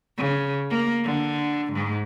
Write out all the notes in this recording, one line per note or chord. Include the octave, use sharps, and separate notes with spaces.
C#3
A#3
D3
G#2